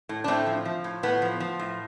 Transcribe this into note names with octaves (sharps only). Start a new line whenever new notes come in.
A2
D4
A2 A3 C4
F3
F3
A2
A2 B3
F3
F3
A2